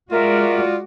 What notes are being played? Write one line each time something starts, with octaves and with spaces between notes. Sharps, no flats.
G#3 F4 F#4 A#4 D5 E5